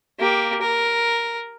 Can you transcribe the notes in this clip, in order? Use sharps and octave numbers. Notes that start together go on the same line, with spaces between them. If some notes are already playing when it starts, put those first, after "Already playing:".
A#3 G4
A#4